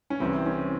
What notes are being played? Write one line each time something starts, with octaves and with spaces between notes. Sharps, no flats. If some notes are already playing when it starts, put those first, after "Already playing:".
C#4
C2 C3 E3 C4
C#4